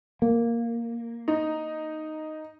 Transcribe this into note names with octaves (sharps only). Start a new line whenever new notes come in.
A#3
D#4